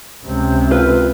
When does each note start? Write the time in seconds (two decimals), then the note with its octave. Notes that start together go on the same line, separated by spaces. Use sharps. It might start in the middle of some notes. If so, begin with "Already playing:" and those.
0.24 C#2 C3
0.71 F4 B4